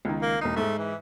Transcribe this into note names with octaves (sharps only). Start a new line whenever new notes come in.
C#2 D#3
A#3
E1 A#3 D#4 C7
G#2 G#3 A3
E3